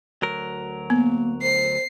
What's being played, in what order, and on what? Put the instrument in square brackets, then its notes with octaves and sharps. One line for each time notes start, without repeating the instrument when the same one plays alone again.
[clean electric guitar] D2 F#3 A#4
[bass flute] A#3 [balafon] B3
[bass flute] C5 [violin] C7